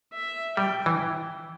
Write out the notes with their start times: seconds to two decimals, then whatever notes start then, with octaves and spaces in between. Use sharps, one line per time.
0.13 E5
0.57 G3 G5
0.86 E3